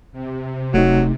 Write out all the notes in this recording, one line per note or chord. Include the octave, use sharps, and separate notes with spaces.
C3
E1 F#3 A3 D#4